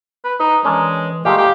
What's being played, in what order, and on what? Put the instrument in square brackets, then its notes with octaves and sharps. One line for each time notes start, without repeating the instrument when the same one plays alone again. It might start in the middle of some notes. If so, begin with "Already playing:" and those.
[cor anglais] B4
[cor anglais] D#4 [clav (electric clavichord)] B4
[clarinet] E3 [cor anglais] G#3 [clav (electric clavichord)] C#4 D4 A#4
[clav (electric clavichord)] A#2 G#3 A3 [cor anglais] G4 [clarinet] F5
[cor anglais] G4